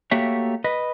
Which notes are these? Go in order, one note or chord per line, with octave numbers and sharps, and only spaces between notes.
A3 A#3 F#4 G4 C#5 E5
B4 D#5